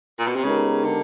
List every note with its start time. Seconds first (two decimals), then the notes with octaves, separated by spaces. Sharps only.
0.19 A#2
0.27 B2
0.36 C3
0.43 C#3 G#3 B3 D#4 G4 A#4
0.84 D3